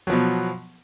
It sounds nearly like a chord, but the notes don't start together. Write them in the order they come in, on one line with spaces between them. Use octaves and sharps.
F#3 F3 B2